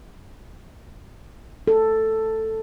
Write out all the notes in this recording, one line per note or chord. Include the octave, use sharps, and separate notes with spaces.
A4